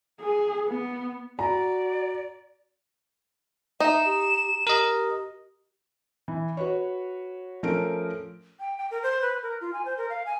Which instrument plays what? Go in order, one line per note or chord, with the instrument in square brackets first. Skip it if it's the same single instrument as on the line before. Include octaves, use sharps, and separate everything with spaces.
[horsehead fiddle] G#4
B3
[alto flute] F#4 [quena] D5 [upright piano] A#5
[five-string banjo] D#4 [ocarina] E5 [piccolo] E7
[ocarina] G4
[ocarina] G4 [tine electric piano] A#4 D#5
[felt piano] E3
F#4 B4 C#5
F3 A3 C#4 A#4 D7
[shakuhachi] G5
G5
A#4
C5
B4
A#4
F4
G#5
C5
A#4
F5
G#5